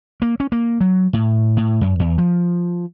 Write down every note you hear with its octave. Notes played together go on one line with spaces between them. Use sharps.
A#3
C#4
A#3
F#3
A2
A2
F#2
E2
F3